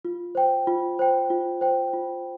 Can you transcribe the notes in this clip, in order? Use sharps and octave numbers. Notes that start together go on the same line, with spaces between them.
F4
C5 G5
F4
C5 G5
F4
C5 G5
F4